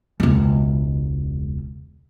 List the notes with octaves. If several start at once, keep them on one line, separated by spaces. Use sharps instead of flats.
E1 C#2